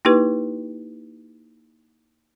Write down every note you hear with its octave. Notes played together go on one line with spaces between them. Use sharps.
A#3 D#4 E4 G4 B4